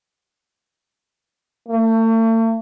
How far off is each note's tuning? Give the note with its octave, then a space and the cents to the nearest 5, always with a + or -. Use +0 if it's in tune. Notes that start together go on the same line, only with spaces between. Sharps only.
A3 +40